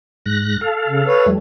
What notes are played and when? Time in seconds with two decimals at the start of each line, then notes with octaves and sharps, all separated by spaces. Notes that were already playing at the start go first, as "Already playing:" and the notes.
0.26 G#2 F#6 A#6
0.61 A4 F5
0.88 C#3
1.07 B4 C#5
1.26 F2 G3 A3